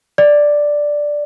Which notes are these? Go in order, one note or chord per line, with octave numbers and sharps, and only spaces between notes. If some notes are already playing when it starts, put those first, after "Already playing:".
D5